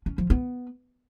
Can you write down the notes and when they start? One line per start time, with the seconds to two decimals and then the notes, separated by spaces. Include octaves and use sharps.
0.06 C#4
0.18 F3
0.30 B3